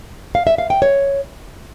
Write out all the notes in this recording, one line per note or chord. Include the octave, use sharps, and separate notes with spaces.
F5
E5
F5
G5
C#5